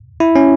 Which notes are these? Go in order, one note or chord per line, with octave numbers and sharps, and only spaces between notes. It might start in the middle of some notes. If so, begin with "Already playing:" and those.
E4
C#4